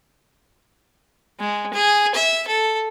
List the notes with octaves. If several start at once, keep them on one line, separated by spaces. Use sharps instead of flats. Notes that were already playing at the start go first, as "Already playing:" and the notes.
G#3
G#4
E5
A4